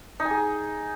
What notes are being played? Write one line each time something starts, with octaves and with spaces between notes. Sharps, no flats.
D#4
G#5
G#4